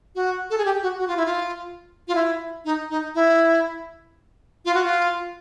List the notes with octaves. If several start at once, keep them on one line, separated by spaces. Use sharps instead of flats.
F#4
A4
G#4
G4
F#4
F#4
F4
E4
F4
F4
E4
D#4
D#4
E4
F4
F#4
F4